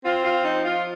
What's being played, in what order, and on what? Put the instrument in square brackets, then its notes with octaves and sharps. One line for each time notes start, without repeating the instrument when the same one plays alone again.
[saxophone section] C4 F4
F4
F3 D#4
F4